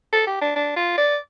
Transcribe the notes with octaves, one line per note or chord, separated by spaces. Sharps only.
A4
G4
D4
D4
F4
D5